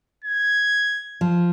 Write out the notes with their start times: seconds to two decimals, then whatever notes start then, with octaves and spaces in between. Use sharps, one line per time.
0.24 G#6
1.21 F3